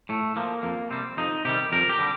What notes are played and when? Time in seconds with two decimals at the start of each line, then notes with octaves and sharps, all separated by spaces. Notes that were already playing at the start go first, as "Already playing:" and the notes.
0.09 A2 A3
0.36 F3 A#3
0.63 F2 A#3
0.90 C3 G3 C4
1.17 F2 D#4
1.45 C3 D#3 G3 G4
1.72 F2 A#4
1.89 G4
1.98 D3 G3